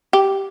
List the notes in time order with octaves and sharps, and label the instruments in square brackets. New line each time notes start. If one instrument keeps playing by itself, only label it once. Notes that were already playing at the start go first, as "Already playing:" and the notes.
[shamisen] G4